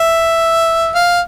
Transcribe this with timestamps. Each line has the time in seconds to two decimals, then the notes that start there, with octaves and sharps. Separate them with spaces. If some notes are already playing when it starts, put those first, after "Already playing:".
Already playing: E5
0.95 F5